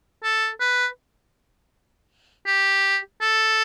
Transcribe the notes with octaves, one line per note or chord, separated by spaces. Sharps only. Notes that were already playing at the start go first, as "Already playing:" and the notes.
A4
B4
G4
A4